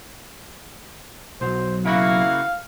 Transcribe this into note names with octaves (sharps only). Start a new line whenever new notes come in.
B1 F#3 C5
C#3 A#3 E4 F#4 F5